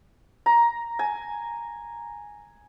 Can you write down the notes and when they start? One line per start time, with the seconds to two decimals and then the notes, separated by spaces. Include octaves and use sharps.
0.46 A#5
0.99 G#5